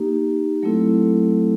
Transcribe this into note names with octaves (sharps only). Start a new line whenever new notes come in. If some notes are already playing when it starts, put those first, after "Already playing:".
Already playing: A#3 D#4 G4
F#3 A3 C4 E4 A4